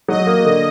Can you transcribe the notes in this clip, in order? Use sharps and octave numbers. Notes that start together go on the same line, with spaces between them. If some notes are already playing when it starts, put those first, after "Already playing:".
F#3 D#5
A#3
D3